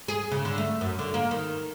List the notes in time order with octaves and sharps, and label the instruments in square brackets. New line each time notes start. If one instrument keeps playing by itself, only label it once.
[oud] G#4
C#3
D3
A3
F#2
D3
A#3
D#3